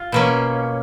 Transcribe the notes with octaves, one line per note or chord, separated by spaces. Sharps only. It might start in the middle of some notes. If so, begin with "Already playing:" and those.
Already playing: F4
B2 A#3 C#4